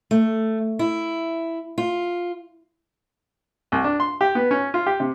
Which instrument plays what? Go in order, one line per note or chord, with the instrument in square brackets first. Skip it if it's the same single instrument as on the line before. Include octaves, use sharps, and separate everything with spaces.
[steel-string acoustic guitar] A3
E4
F4
[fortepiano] C2
D4
C6
G4
B3
C#4
F4
G4
C3